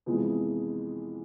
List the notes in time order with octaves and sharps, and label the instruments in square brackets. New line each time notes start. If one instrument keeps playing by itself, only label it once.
[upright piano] F2 C3 E3 G#3 B3